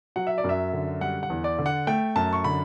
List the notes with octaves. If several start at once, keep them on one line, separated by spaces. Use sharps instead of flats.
F#3 F#5
E5
D5
F#2
E5
D3
G3 F#5
F#5
E2
D5
D3
F#5
A3 G5
F#2 A5
C#6
D3 B5